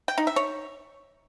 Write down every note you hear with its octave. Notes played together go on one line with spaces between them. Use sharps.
G5
D#4
E5
C#5